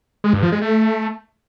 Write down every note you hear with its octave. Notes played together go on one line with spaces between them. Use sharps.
G#3
G2
F3
G#3
A3